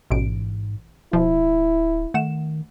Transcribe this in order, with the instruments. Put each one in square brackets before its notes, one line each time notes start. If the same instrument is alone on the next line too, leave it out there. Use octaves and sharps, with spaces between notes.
[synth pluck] A1 B2 D7 [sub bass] G#2
[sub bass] D1 [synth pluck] B2 F3 [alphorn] E4
[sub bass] D#3 [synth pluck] A3 F#5 E7